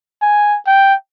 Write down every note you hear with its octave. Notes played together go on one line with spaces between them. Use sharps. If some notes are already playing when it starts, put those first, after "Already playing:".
G#5
G5